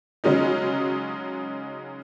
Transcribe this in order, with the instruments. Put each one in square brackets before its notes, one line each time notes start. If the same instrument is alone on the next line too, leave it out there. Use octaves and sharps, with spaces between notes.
[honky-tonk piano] C#3 F#3 G#3 C#4 D#4